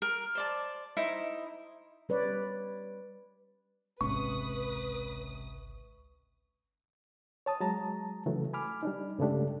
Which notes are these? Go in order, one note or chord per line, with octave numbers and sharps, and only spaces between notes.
A#4
C5 D5 A5
D#4 E4 C5
G3 B4 C#5 D5
G#1 C#2 C3 G#3 C#4 B4 C#6 D#6
C#5 A5 D#6
F#3 G#3 A5 A#5
C#3 E3 F#3 A3
G#5 B5 D6 F6
G3 D4 D#4
G2 C#3 G#3 A3 D4 G4